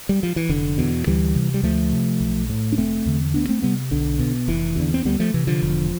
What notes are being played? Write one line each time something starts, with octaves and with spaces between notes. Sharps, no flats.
G3
F3
E3
F1 D3
E2 B2
D2 E3 G3
C3
G3
D2 F3 A3
C3
B1
A2
D4
F1 A3 C4
E2 D3
D2 B3 D4
A3 C4
C3 G3 B3
B1 D3
B2
F1 E3
E2 D3
C4
D2 G3 B3
F3 A3
C3 E3
D3 F3
E1